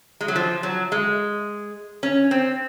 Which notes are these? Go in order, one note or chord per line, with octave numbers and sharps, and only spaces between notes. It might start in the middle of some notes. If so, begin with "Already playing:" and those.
G#3
F#3
F3
F#3
G#3
C#4
C4